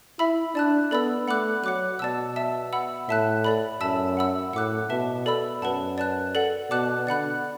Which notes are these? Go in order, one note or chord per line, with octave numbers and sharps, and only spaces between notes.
E4 E5 B5 E6
D4 D5 A5 F#6
B3 A4 D5 B5 E6
A3 F#5 B5 D6 F#6
F#3 F#5 D6 F#6
B2 D5 A5 E6
E5 A5 E6
F#5 B5 E6
A2 E5 A5 F#6
A4 D5 B5
F#2 E5 A5 E6
F#5 B5 E6
A2 F#5 D6 F#6
B2 B4 E5 A5
A4 D5 B5 E6
F#2 B4 F#5 A5
D5 A5 F#6
A4 D5 F#5
B2 D5 F#5 A5 D6 F#6
D3 D5 F#5 B5 F#6